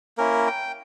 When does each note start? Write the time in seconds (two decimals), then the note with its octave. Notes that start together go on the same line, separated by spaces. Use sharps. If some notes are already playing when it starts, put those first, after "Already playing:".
0.18 A#3 C#4 E4 A#4
0.47 G5